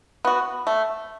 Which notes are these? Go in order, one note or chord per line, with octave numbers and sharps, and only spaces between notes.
B3 F#4
A3